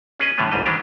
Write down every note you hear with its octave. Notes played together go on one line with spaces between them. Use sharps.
C#4 G#4 B4 D#5
A2 D3 E3 G3 A3 B3
G1 C2 G#2 G3 D#5
D#3 E3 G#3 D4 G4